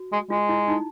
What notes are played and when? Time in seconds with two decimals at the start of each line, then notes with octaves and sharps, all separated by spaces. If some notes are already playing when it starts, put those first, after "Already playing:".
Already playing: F#4
0.12 G#3
0.30 G#3 F4
0.49 E4
0.68 D#4